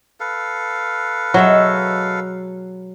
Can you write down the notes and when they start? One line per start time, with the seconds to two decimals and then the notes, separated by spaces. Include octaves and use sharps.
0.20 A4 B4 F5
1.34 B2 F#3 G#3 E5